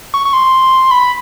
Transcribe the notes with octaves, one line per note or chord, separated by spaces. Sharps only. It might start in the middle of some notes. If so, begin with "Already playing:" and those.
C#6
C#6
C6
B5